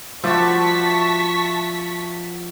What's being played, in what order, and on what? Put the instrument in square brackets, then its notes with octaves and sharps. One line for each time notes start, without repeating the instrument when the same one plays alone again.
[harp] F3 [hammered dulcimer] F#4 D5 E5 [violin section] A5 C#6 B6